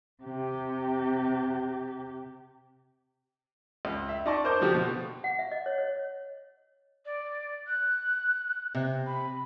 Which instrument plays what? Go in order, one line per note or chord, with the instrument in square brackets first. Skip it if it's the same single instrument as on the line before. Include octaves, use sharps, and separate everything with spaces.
[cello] C3 G4
[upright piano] C#2
E5
D#4 D5 D#5 A5 C#6
A#4 C5 A5 D6 G6
D3 F3 F#4 G4
B2
[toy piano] F#5
E5
D#5
C#5
C#5
[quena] D5
F#6
[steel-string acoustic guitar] C3
[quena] B5